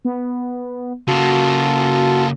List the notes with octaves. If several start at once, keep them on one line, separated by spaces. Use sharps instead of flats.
B3
C#3 A#3 F4 F#4 A4